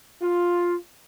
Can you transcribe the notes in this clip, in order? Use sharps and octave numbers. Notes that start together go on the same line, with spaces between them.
F4